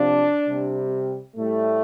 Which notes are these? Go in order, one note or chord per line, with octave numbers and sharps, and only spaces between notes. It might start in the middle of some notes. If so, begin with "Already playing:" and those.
Already playing: C3 F3 D4
C3 G3
A2 G3 A3